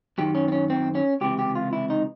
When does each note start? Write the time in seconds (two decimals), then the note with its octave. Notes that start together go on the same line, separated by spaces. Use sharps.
0.18 F#2 D#3 G4
0.35 C#4
0.48 C4
0.52 C#4
0.70 C4
0.95 C#4
1.21 C#2 C3 E3 G4
1.39 G4
1.55 F4
1.73 E4
1.90 D#4